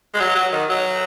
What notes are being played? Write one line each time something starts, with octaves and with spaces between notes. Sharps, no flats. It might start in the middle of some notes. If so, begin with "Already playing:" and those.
G#3
F#3
F#3
D#3
F#3